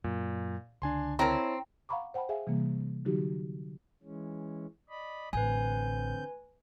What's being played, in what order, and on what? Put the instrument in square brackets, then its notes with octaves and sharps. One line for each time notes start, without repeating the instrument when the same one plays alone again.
[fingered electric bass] F#2 F#3 [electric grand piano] A#2
[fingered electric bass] C#2 D3 [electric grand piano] D4 G#5 C6
[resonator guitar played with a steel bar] C4 [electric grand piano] E4 C#5 A5 [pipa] A#4 A#5
[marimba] F5 F#5 A#5 B5 C#6 D6
C5 F#5 G5 A5 B5
G#4 E5 F5 G#5
C3 E3 G3 A#3
D3 E3 F#3 D#4 F#4 G4
[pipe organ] E3 G#3 C#4
D5 D#5 B5
[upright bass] A1 [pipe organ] D3 C4 G6 [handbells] B4 G#5